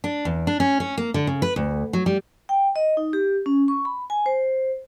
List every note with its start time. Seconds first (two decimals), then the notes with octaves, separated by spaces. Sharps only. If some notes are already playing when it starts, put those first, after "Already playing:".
0.04 D4
0.25 E2
0.47 D4
0.60 C#4
0.80 C#4
0.97 A#3
1.14 D3
1.27 C#3
1.42 B4
1.56 D2
1.93 F#3
2.06 G3
2.49 G5
2.76 D#5
2.97 D#4
3.13 G4
3.46 C#4
3.68 C#6
3.85 B5
4.10 G#5
4.26 C5